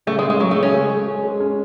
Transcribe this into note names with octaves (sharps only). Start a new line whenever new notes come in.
C#3 A3
G#3
C#3
G#3
C#3 F#3
A3
C#3
C#4
G#3
G#3
G#3
G#3
C#4